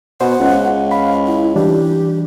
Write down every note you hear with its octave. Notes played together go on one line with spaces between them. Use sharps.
B2 C5 F#5
C#2
F5 B5
E4
E3 G3 D4 G4